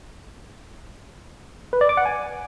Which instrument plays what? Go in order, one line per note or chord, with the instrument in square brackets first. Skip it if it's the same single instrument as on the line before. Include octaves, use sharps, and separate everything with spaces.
[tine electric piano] B4
D5
D6
F#5
G#5